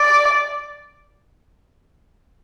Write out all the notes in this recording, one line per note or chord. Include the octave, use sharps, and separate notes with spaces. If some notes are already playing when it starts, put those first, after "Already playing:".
Already playing: D5